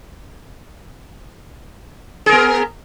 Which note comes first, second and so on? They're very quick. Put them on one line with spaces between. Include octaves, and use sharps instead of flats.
G#4 A#4 B3